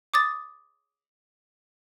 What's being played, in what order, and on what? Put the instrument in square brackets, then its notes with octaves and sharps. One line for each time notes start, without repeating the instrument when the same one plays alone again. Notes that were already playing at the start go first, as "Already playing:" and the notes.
[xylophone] D6 D#6 A6